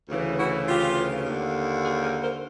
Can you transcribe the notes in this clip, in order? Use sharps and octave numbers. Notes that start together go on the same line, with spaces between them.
D2 C#3 E3
E4 F#4
F4 G4
D#2 D3
F#4 G#4
G#4 A#4
A#4 C5